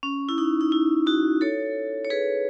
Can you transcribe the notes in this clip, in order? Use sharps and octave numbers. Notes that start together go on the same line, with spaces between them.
C#4
E4
D#4
D#4
E4
D#4 F#4
A4 C#5
C#5
G#4 B4